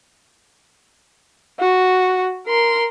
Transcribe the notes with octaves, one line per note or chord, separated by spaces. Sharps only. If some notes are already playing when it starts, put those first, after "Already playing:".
F#4
A#4 C6